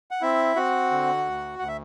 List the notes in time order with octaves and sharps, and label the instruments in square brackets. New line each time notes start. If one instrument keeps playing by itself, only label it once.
[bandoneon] F#5
C4 E4 E5
C4 F#4 F#5
D3
D2
D2 F#5
E5